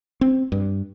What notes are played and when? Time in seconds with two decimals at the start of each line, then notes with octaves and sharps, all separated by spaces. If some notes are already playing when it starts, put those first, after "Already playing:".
0.21 C4
0.52 G2